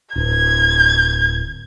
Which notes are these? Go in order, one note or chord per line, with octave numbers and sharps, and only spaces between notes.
D1 G#6